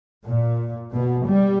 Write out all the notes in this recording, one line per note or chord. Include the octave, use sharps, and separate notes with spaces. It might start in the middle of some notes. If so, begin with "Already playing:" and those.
A#2
B2
G3